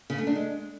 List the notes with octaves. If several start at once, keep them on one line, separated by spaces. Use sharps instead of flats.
C#3
A3
D4
G#3